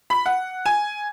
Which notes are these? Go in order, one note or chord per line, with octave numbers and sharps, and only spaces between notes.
B5
F#5
G#5